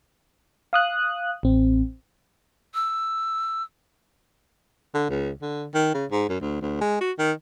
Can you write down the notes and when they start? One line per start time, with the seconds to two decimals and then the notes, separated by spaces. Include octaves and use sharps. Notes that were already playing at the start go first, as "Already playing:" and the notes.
0.73 F5 D#6 F#6
1.43 A1 C4
2.74 E6
4.94 D3
5.10 C#2
5.41 D3
5.74 D#3
5.94 C#3
6.11 G#2
6.29 F#2
6.41 D2
6.62 D2
6.81 G#3
7.01 F#4
7.19 D#3